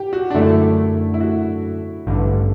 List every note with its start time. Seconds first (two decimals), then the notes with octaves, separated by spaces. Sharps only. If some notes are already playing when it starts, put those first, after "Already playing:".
Already playing: G4
0.13 F#4
0.30 D4
0.34 F#2 D3 A3 E4
1.14 E4
1.20 F#4
2.07 A1 G2 D3